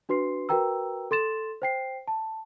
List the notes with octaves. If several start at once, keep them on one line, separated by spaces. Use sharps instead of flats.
D4 F#4 B4 C6 C7
F#4 A#4 B4 G5 A#5 E6
A4 C6 A6 E7
C5 G5 C7
A5